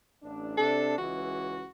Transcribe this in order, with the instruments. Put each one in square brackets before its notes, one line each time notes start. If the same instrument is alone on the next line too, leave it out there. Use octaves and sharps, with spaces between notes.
[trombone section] A1 D4
[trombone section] C3 D4 [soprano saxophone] A4
[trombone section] C#2 E3 [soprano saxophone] F#4